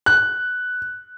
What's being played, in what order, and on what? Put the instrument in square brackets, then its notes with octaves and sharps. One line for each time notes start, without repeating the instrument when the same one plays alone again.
[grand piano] F#6